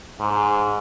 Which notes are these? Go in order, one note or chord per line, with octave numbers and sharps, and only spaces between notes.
G#2